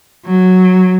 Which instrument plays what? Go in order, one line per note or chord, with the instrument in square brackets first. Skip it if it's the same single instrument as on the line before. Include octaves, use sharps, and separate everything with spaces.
[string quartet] F#3